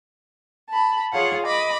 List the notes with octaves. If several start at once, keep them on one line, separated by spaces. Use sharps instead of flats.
A5 B5
F4 G#4 C#5 F5 F#5
D#5 B5 D6